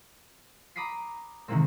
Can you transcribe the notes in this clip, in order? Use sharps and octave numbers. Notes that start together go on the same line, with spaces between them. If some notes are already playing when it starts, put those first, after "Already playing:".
A#5 B5 D6 D#6 B6 C7
C3 D#3 E3 G#3 A#3 C4